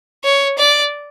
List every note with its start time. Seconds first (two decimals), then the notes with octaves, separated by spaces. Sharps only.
0.24 C#5
0.58 D5